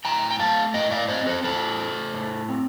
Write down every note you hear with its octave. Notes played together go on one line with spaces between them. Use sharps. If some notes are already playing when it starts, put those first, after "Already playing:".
A2 G5 A#5
G5
A3 F5 A5
A2 D#5 G5
D5 F5
C4 C5 D#5
A4 C5
A2 A4 C5
A3
A2
C4